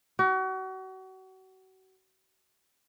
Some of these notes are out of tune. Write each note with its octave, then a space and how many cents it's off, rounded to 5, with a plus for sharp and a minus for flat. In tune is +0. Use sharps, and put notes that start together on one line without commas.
F#4 +35